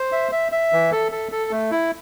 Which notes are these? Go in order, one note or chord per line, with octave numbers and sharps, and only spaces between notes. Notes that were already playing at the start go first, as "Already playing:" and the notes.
Already playing: C5
E5
E5
E5
E3
A4
A4
A4
A3
E4